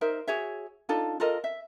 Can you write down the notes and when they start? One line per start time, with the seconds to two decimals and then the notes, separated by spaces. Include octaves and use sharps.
0.01 D#4 A#4 C5 E5
0.27 F#4 G#4 C#5 E5
0.89 D4 D#4 F4 A4
1.20 F4 A4 A#4 D#5
1.44 E5